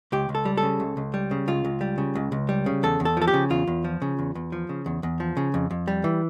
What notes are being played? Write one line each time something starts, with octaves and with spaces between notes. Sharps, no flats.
C#2 G4
C#2
A4
G3
A4
C#3
C#2
C#2
G3
C#3
C#2 F4
C#2
G3
C#3
C#2
C#2
G3
C#3
E2 A4
E2
A4
F3 A4
G4
C#3
E2 F4
E2
F3
C#3
E2
E2
F3
C#3
E2
E2
F3
C#3
F2
F2
G3
E3